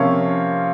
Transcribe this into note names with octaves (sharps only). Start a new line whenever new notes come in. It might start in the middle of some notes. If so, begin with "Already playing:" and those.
Already playing: C3 F3 A#3 C#4 C#5 F5